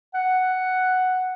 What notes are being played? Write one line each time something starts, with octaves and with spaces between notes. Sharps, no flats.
F#5